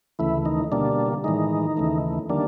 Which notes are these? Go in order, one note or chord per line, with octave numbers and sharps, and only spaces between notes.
D2 C#3 E3 A3 E4
D#3 D#4
B2 D3 G3 A#3 D4
A2 D#3 E3 G#3 D#4
D#2 C#3 E3 A3
D3 D#3 G3 A#3 D4